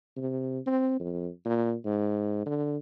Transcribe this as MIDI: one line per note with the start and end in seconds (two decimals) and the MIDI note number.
0.17 0.59 48
0.67 0.96 60
1.00 1.29 41
1.45 1.74 46
1.86 2.43 44
2.46 2.77 50